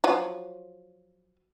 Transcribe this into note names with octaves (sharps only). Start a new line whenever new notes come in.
F3 F#3